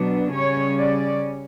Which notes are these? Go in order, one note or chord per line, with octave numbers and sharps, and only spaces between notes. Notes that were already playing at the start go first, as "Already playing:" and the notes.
Already playing: B2 F#3 B3 D4
C#3 G3 C#4 C#5
D5